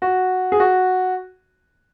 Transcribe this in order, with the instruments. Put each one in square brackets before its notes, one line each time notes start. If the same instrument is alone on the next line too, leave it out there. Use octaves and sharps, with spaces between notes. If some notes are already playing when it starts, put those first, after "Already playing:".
[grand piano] F#4
G#4
F#4